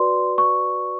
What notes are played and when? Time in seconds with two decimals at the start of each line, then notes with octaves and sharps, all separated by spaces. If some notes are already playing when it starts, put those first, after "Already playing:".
Already playing: F#4 B4 D5 C6
0.38 C#6